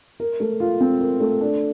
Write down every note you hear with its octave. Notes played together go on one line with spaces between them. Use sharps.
A#4
A3
F4
C4
A#4
A3
D4